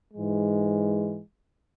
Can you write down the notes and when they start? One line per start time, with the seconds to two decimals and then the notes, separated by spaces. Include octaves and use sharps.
0.14 G#2 E3 G#3